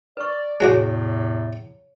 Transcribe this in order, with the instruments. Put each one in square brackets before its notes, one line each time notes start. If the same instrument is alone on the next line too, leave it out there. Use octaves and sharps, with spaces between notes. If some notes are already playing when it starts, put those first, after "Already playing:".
[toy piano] B4 C#6 [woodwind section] D5
[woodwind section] E2 A2 C3 [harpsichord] G#3 F#4 D6 [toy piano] C#5